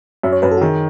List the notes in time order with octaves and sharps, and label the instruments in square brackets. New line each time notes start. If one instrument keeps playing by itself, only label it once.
[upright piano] F#2 [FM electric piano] E5
[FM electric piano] C#5
[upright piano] F#2 [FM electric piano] B4
[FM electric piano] A4
F#4
[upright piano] D#3 [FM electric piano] G#4